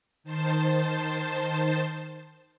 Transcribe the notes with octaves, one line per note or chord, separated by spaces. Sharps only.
D#3 C5 A5